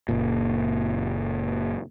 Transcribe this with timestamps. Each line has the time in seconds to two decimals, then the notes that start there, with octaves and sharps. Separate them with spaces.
0.09 F#1 A#2